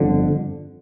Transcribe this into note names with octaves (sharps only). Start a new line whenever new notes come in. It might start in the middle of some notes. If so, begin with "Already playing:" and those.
Already playing: G1 F2 D3